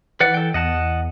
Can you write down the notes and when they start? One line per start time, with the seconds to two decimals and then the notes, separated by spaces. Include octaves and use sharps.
0.20 E3 B4 D5 F#5
0.34 A4 G5
0.54 E2 D#5 F#5 A5